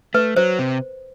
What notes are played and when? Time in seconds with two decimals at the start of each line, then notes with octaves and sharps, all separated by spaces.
0.14 A3 B4
0.37 F#3 C5
0.59 C3